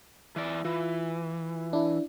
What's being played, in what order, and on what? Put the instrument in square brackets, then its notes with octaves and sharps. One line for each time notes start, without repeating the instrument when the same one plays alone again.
[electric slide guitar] E3 D5
[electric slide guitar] E3 [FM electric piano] F4
[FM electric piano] D4 E4